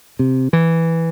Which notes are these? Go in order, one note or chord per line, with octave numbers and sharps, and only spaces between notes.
C3
E3